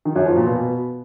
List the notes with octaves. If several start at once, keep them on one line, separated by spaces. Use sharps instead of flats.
D#3
F#2
F3
A#2
B2